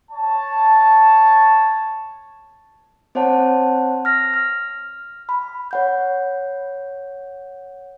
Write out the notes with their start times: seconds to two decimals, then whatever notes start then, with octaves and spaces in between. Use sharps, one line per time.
0.11 C#5 A5
3.15 C4 C5 C#5 F#5 A5
4.05 F6 A#6
4.34 F6
5.29 B5
5.71 C#5 F#5 G6